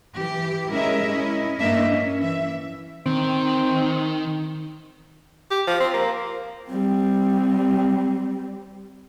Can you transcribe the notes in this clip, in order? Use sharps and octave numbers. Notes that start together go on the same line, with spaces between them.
E3 G4
G#3 C#4 E4 A#4 D#5 E5
C#4 E4 D#5
G2 A#3 D4 D#5 E5
C#4
E3 E5
D#3 C4
G4
F3
C4
A#3
G3 C4